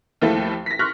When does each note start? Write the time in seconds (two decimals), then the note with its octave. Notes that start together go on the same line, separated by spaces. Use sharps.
0.22 D#2 F3 A3 E4 A4
0.66 A#6 B6
0.79 C6 C#6 F6 F#6 A#6